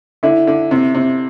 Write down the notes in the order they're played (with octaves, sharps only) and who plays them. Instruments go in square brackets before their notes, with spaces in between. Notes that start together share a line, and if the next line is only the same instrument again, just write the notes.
[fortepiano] D3 [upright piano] E4
[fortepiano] D3
C3
C3